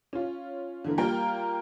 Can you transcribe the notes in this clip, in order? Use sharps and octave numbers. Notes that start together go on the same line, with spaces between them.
C#4 F4
D3 E3 A#3
G3 A#3 F4 A#4 G5